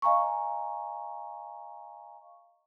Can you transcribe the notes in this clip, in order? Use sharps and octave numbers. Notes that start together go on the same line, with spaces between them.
D#5 F5 G#5 A#5 C#6